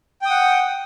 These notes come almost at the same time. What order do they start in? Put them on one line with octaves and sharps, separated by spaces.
G5 D#6 F#5